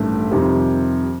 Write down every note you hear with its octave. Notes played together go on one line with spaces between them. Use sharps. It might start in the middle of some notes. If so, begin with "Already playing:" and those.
Already playing: A1 G2 D#3 A3
F2 C3 D#3 G3 C4